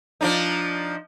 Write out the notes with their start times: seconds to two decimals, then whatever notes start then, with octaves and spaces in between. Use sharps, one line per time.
0.21 F3 D4 D#4